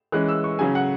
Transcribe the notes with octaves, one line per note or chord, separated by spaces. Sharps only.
E3 G#3 C#4 F#6
E6
C#6
C#3 F#3 C#4 G#5
F#5